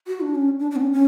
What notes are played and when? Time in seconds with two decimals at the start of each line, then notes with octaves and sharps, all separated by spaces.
0.07 F#4
0.21 D4
0.35 C#4
0.60 D4
0.71 D4
0.76 B3
0.81 C#4
0.93 C#4